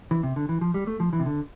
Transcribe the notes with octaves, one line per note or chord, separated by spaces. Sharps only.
E3
C3
D3
E3
F3
G3
A3
F3
E3
C3
D3